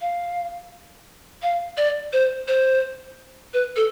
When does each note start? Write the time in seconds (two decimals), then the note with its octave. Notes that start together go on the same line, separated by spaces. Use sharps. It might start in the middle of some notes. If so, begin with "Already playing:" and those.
0.01 F5
1.43 F5
1.77 D5
2.13 C5
2.48 C5
3.54 B4
3.76 A4